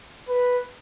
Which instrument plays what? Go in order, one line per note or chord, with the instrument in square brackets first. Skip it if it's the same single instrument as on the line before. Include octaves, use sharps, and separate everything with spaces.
[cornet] B4